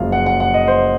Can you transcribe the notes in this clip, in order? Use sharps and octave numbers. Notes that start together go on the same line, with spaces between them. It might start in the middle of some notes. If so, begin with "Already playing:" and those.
Already playing: F#1 F#2 F3 G#3 F5
F#5
F#5
F#5
D#5
C5